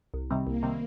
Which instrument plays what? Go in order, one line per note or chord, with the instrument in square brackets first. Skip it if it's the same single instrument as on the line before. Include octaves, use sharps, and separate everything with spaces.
[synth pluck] C2
C3 D#3 G3 C4
[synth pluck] C2 [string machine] A#3
[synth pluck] C3 D#3 G3 C4